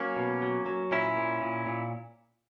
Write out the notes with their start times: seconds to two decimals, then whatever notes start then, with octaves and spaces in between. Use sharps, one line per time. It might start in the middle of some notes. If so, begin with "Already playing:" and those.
Already playing: F#3 A#3 C#4
0.16 B2
0.42 F#3
0.66 F#3
0.91 A#2 C#4 E4
1.17 A#2
1.41 A#2
1.66 A#2